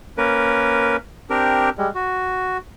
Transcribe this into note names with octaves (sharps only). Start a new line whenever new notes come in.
A#3 C#4 A#4 B4
C4 D4 G4 A#4
G3 G#3
F#4